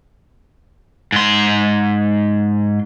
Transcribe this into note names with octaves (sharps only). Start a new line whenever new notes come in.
G#2 C6